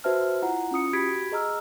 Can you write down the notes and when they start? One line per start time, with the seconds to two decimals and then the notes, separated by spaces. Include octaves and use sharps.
0.04 F#4 B4 C5 E5 A5 F6
0.42 E4 F4 F#5 A#5
0.71 C#4 F4 D#6 C#7
0.93 F#4 G4 B5 G#6 B6 D7
1.32 G#4 D#5 A#5 E6 F6